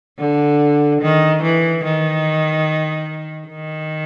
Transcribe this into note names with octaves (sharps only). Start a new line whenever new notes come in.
D3
D#3
E3
D#3
D#3